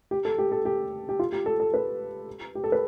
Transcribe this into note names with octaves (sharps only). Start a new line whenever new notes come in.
G4
A4
G4
A4
G4
G4
F4
G4
A4
A4
B4
G4
A4
B4